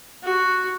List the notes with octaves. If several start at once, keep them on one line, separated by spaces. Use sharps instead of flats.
F#4